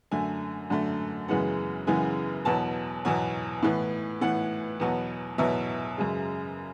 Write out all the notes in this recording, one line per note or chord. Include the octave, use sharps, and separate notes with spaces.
F#2 D3 A3 G#5
F#2 D3 A3
F#2 C#3 E3 G#3 B3 F#5
F#2 C#3 E3 G#3 B3 G#5
E2 B2 F#3 B3 A5
E2 B2 F#3 B3 G#5
A2 E3 B3
A2 E3 B3 F#5
E2 B2 F#3 B3
E2 B2 F#3 B3 E5
F#2 C#3 G#3